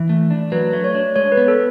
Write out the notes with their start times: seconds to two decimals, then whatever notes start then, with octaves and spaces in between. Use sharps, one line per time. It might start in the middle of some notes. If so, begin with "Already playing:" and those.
Already playing: E3
0.09 A3
0.31 D4
0.52 F#3 B4
0.73 A3
0.84 C#5
0.95 D4
1.16 G#3 C#5
1.32 B4
1.37 B3
1.48 A4